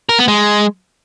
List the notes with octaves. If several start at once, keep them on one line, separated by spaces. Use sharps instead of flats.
A#4
B3
G#3